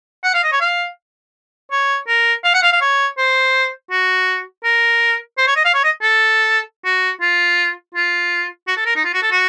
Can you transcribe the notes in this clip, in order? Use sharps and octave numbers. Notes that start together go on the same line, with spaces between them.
F#5
F5
D#5
C#5
F5
C#5
A#4
F5
F#5
F5
F5
C#5
C5
F#4
A#4
C5
C#5
D#5
F5
C#5
D#5
A4
F#4
F4
F4
F#4
A4
A#4
D#4
F4
F#4
A4
F#4